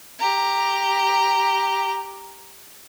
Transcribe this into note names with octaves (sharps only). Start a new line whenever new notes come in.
G4 A#5